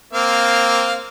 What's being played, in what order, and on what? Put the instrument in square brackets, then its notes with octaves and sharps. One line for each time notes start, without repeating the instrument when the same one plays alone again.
[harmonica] A#3 C4 F5